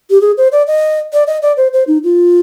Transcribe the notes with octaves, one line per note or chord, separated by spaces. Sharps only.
G4
G#4
C5
D5
D#5
D5
D#5
D5
C5
C5
D#4
F4